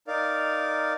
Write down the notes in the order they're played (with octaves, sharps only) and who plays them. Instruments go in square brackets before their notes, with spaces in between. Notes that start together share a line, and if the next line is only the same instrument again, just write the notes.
[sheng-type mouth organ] D#4 A#4 D5 F5